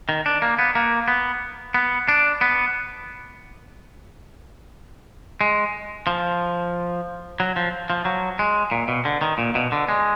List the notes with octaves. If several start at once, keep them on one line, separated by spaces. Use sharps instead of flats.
D#3
D4
A#3
B3
A#3
B3
B3
D4
B3
G#3
F3
F#3
F3
F3
F#3
G#3
A#2
B2
D3
D#3
A#2
B2
D3
G#3